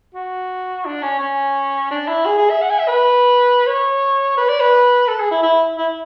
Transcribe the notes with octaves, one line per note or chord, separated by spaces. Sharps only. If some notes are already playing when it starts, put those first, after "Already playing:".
F#4
D4
C#4
C#4
D4
E4
G#4
G#4
E5
F#5
G#5
E5
B4
C#5
B4
D5
B4
A4
G#4
E4
E4
E4